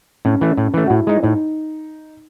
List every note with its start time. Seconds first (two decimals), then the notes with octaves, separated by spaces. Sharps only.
0.25 A2 C#4
0.41 E3 A3
0.57 A2
0.74 E3 A3
0.86 F#4
0.90 A2 E4
1.07 G#3 D#4
1.23 A2 D#4